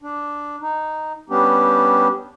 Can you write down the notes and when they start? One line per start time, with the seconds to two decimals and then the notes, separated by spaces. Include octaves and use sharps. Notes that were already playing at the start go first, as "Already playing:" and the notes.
0.01 D4
0.61 D#4
1.30 G3 B3 C#4 D4 G4